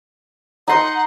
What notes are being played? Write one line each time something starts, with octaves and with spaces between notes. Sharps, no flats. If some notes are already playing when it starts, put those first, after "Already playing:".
D#4 F#5 C6